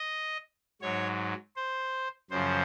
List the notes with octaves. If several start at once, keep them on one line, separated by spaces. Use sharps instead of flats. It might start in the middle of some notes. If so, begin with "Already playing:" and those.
Already playing: D#5
G#2 F#3 C#5
C5
F#2 C#3 F3 C5